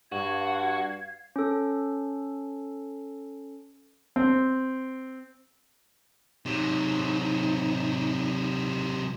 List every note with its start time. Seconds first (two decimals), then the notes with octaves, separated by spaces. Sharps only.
0.12 G2 F#4 F5 G#6
1.36 C#4 A4
4.16 C4
6.46 C3 F#3 D#4